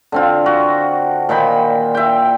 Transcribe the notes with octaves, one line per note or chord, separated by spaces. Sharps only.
D3 C4 F4
F#4
A#2 D#3 C5 B5
E5 G5